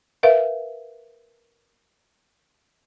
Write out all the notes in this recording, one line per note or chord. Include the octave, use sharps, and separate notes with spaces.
A#4 B4 E5 F5